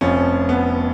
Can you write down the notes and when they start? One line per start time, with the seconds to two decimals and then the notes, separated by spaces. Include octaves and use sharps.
0.01 F1 F2 F3 C#4
0.49 B3